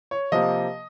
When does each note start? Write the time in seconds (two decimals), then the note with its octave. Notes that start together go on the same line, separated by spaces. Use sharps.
0.11 C#5
0.32 C3 F3 A#3 D#5